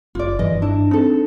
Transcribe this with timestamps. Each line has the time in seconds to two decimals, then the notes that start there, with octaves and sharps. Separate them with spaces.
0.15 F#1 F4 D5
0.39 G2 E3 D#5
0.62 D4 E4
0.91 C4 D#4 A4